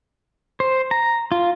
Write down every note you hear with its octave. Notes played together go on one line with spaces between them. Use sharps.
C5
A#5
F4